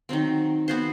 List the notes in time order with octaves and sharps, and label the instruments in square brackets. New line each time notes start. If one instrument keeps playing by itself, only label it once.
[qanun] D#3 F#3 C4
B3 F#4 C5